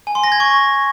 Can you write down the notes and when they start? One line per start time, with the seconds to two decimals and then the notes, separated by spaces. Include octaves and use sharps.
0.07 G#5
0.15 C6
0.24 A#6
0.32 G#6
0.40 C#6